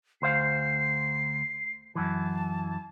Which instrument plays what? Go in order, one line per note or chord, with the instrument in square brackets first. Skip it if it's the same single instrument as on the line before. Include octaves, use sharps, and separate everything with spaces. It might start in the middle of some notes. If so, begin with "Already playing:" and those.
[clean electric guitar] D2 C5 F5 [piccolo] C7
[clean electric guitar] F#2 E3 [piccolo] A5